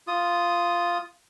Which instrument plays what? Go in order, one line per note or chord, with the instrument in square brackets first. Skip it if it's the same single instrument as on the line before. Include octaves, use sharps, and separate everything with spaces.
[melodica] F4 D#6